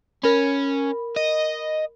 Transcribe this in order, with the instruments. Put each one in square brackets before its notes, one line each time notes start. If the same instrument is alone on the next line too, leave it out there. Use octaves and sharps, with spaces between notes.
[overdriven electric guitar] C#4 [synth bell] A#4 B5
[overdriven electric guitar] D#5